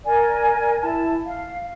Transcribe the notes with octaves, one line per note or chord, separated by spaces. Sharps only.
A#4 D5 G#5
E4 A5
F5